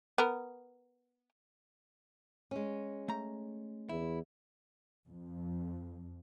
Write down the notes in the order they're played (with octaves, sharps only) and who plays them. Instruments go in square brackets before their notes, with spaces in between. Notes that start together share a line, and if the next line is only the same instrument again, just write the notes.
[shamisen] B3 A#4
[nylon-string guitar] G#3 C#4
[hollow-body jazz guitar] A3 A#5
[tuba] E2 [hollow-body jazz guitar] E4
[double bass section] F2